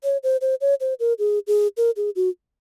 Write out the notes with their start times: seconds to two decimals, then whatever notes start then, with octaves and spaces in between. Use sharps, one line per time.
0.04 C#5
0.23 C5
0.41 C5
0.61 C#5
0.80 C5
1.00 A#4
1.19 G#4
1.47 G#4
1.77 A#4
1.96 G#4
2.16 F#4